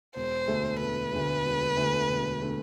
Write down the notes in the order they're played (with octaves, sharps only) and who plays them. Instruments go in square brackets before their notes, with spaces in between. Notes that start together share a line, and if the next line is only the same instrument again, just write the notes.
[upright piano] E1 [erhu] C5
[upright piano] D2 D3 A3
[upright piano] E1 [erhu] B4
[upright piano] D2 D3 A3
E1
D2 D3 A3
E1
D3 A3